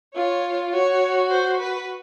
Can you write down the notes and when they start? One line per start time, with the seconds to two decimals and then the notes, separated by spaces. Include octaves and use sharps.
0.15 F4 C#5
0.73 F#4 C#5
1.30 C5
1.60 B4